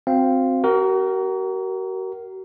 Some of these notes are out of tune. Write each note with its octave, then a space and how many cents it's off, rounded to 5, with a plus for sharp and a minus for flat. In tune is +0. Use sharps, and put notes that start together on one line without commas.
C4 +0 F#4 -30 F5 -5
F#4 +40 A#4 +0